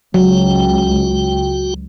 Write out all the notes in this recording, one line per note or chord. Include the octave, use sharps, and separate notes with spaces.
C#2 F#3 F#4 G5